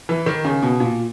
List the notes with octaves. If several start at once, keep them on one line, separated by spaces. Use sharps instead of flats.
E3
D#3
C#3
B2
A#2